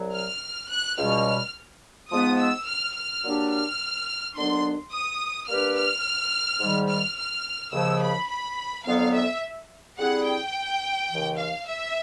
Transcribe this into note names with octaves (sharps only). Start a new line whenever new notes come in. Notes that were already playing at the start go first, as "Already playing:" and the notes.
Already playing: C2 F#3
F6
F#6
C#2 B2 G3 F6
G#2 F3 G#3 B3 D#4 D#6
E6
F6
F6
A#2 F#3 A#3 D4 G4
F6
D#2 D3 F#3 B3 D4 C6
D#6
G3 A#3 D4 G4 B4 F6
F6
G#2 D#3 G3
F6
F6
D#2 C#3 F3 E6
B5
B5
F2 D3 F#3 B3 F5
E5
D3 G3 C4 E4 G#4 F#5
G5
D#2 C#3 E3
F5
E5